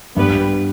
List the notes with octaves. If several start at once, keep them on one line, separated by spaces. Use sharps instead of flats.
G2 B3 G4 B4